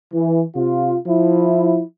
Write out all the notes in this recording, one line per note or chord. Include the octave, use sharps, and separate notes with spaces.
E3
C3 F4
F3 E4